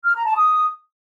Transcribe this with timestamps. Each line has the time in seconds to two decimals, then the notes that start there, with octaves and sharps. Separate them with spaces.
0.05 F6
0.15 A#5
0.25 A5
0.35 D#6